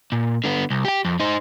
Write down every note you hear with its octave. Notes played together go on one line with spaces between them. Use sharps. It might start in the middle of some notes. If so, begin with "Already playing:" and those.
A#2
D3 B3
C2
G4 G5
F2
D#4 C5